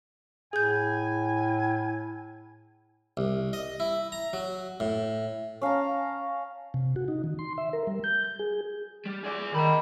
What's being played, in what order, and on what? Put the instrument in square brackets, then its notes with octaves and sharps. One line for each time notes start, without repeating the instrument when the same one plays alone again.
[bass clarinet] A2 [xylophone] G#4 G6 [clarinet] G#5
[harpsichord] C2
D#5
E4
A#5
F#3
A2
[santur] C#4 F5 A5 A#5
[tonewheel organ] C3
F#4
D#4
D#3
C6
E5
A#4
G3
G6
G6
G#4
[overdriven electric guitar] G3
G#4 D5
[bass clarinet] D#3 [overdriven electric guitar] D#5 B5